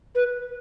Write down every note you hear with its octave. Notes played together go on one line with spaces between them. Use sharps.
B4